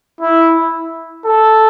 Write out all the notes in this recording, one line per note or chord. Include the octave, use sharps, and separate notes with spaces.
E4
A4